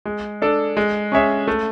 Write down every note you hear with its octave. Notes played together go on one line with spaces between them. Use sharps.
G#3
D4 A4 D5
G#3
C#4 G#4 C#5 E5
A3